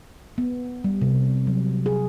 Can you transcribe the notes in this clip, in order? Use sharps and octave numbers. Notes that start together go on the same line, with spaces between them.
B3
G3
C3
F#3
G#4